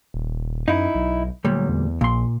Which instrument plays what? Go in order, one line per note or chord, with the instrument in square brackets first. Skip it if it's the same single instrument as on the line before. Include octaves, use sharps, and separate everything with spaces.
[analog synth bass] D#1
[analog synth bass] F#2 [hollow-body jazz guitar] D#4 E4
[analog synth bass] B1
[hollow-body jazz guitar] D2 A#2 G3 [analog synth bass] F#3
[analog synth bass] E2
[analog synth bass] A#1 [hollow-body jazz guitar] A#2 C6